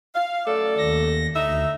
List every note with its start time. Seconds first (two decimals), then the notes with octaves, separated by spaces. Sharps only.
0.15 F5
0.47 F#2 A3 A4 D5
0.78 D#2 A#6
1.36 D2 D#4 A4 E5